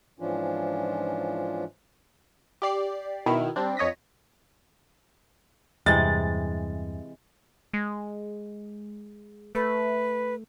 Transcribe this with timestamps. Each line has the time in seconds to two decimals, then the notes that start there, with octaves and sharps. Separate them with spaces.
0.20 G#2 E3 F3 C#4 D4 F4
2.62 G4 D5 C7
3.26 B2 D#3 E4 F6
3.56 G3 C4 D4
3.77 F2 C#5 D#5 A#6 B6
5.86 E2 G2 C3 E3 G#3 A6
7.74 G#3
9.55 A3 B4